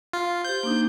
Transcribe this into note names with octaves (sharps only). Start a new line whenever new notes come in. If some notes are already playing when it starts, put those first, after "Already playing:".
F4
G4 C5 G6
A#3 D4 D#4